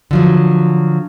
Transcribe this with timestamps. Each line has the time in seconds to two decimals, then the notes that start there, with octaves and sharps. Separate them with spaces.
0.11 D3 F3 F#3